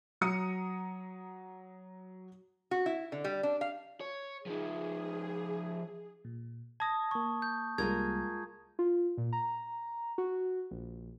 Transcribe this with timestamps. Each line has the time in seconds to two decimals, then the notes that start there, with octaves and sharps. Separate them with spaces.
0.21 F#3 A#5 D#6 C#7
2.71 F#4
2.86 E4
3.12 D3
3.24 G3
3.43 D4
3.61 F5
4.00 C#5
4.46 F3 D#4 G#4
6.25 A#2
6.80 A5 D#6 G#6 A#6
7.11 A#3 C#6 G#6
7.42 G6
7.78 C2 G3 G#3 A#3 F4 A#4 G#6
8.79 F4
9.18 A#2
9.33 A#5
10.18 F#4
10.71 A#1